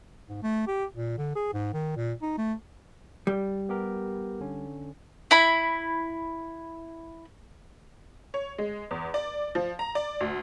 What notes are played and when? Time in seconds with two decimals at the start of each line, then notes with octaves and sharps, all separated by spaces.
0.29 G#2
0.43 A3
0.67 G4
0.95 A#2
1.18 D3
1.36 G#4
1.53 G#2
1.73 D#3
1.97 A#2
2.22 D#4
2.38 A3
3.27 G3
3.69 B3 G4 A#4
4.40 D3 C#4
5.31 E4 B5
8.34 C#5
8.58 G#3
8.91 E2
9.14 D5
9.55 F3
9.79 A#5
9.95 D5
10.21 D2